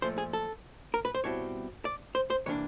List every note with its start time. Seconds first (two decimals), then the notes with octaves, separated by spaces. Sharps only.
0.02 A#2 F3 A3 C5
0.18 G#4
0.33 A4
0.94 A#4
1.05 B4
1.14 C5
1.24 B2 G3 C4 E4 C#5
1.85 D5
2.15 C5
2.30 C5
2.46 C3 E3 G3 A#3 D4 C#5